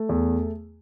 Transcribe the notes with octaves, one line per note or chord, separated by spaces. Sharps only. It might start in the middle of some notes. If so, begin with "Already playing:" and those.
Already playing: A3
E2